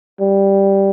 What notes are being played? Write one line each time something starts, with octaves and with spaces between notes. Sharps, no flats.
G3